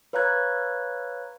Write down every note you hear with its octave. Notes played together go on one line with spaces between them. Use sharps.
B4 C#5 F5 A#5 F#6 G#6